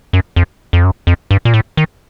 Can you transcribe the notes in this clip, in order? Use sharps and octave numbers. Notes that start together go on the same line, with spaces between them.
F#2
F2
F2
F#2
F2
G2
A#2
A2
D#3